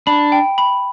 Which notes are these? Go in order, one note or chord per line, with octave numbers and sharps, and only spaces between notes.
D4 B5
G5
B5